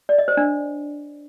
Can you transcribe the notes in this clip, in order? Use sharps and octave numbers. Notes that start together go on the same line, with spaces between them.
D5
D#5
C5
D4